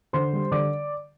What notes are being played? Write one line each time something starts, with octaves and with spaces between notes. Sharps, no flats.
D3 C5 C6
G3
D3 D5 D6